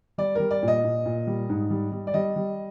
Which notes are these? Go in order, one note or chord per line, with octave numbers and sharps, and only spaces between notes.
G3 D5
G3 A#4
D5
A#2
D#5
A#2
A#2
G3
G#2
G3
G3
D5
G3 D#5
G3